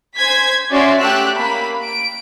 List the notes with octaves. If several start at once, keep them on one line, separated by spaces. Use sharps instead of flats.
C5 G#5 G#6 B6
C#4 F#4 D5 E5 C6
A3 G4 E6 F#6
A#3 B5
D7